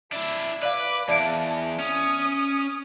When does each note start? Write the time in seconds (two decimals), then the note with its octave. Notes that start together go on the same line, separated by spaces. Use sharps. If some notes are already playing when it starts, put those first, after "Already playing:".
0.12 D4 E4 E5
0.63 B4 D5 F5 D6
1.09 E2 D5 E5 A5 D7
1.80 C#4 D#6